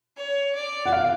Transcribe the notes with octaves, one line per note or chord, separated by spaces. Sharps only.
C#5
D5
F#5
F5